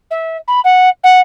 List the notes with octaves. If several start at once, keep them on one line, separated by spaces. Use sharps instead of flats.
E5
B5
F#5
F#5